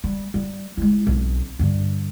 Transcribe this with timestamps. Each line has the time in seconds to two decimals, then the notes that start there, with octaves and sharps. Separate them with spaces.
0.04 G3
0.34 G3
0.77 G#3 E4
1.07 B1 C4
1.59 G2 D3